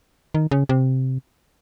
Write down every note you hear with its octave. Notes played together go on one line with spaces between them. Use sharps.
D#3
C#3
C3